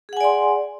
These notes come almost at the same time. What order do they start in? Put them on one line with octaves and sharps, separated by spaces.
G#4 F#5 G#5 D5 C6